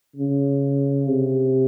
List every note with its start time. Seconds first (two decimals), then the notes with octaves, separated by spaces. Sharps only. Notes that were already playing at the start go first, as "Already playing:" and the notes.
0.16 C#3
1.08 C3